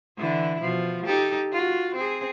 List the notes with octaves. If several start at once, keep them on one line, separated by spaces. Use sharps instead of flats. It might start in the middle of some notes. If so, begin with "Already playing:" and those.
D3 E3 E4
B2 F3
D#4 G4 A4
F4 F#4
C4 G#4